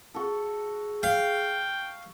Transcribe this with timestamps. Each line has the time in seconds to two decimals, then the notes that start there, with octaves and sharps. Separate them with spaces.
0.14 F#4 G#4 A4
1.03 F5 G5